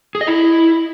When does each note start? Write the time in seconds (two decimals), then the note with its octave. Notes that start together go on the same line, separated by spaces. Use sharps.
0.15 G#4
0.21 D#5
0.27 E4